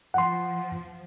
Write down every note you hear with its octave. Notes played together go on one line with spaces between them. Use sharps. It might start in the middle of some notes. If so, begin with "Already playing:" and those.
F3 F#5 C6